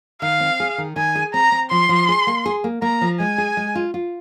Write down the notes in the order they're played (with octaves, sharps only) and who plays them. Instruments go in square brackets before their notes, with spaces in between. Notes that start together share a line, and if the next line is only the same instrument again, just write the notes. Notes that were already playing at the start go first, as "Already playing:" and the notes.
[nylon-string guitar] D#3 [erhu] F5
[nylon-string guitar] C4
G#4
D#3
[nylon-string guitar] D#3 [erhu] G#5
[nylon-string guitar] G#4
[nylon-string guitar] C4 [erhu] A#5
[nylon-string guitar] C4
[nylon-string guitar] F3 [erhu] C6
[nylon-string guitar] F3
G#4
A#3
G#4
A#3
[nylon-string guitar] A#3 [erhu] A#5
[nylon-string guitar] F3
[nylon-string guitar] G#3 [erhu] G#5
[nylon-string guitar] G#4
G#3
F4
F4